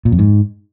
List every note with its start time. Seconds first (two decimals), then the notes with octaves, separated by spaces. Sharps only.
0.05 A#2
0.12 F2
0.19 G#2